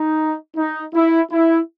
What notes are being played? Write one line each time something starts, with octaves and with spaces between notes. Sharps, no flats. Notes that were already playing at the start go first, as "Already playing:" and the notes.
Already playing: D#4
D#4
E4
E4